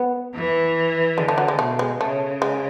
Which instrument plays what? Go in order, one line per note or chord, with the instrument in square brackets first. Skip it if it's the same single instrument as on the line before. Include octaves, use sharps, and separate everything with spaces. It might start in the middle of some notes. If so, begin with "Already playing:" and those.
Already playing: [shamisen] B3
[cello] E3
[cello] D3 [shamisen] G#3
[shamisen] A3
F#3
G#3
[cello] B2 [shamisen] A3
[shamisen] G#3
[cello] C#3 [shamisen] A3
[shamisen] G#3